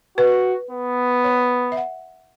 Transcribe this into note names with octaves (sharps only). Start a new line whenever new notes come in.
F#4 B4
B3
C#5
E5
F#5